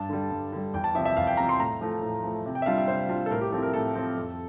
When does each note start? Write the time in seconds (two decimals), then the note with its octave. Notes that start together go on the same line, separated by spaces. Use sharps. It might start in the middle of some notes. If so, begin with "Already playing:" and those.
Already playing: G2 A5
0.09 D3 G3
0.31 G2
0.53 D3 G3
0.74 E2 G5
0.84 A5
0.95 C3 F3 E5
1.05 E5
1.17 E2 F5
1.27 G5
1.37 C3 F3 A#5
1.49 C6
1.59 A2 A#5
1.81 F3 A3
2.02 A2
2.24 F3 A3
2.46 C3
2.55 G5
2.62 E5
2.66 G3 D4 F4 F5
2.78 E5
2.88 C3 C5
3.09 G3 D4 F4
3.26 A4
3.31 A2 A#4
3.41 G4
3.52 F3 C4 E4 A4
3.63 A#4
3.73 A2 A4
3.95 F3 C4 E4
4.17 F2